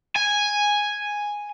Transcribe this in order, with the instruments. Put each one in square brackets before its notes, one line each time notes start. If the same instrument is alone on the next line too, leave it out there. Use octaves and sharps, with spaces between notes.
[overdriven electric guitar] G#5